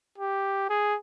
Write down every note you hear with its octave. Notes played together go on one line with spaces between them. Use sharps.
G4
G#4